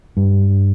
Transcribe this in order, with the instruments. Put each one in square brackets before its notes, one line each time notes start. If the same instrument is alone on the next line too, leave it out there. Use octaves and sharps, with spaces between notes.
[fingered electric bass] G2